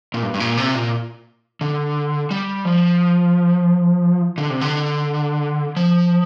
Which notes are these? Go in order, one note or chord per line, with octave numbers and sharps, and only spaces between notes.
A#2
G2
G2
A#2
C3
A#2
D3
G3
F3
D3
C3
D3
F3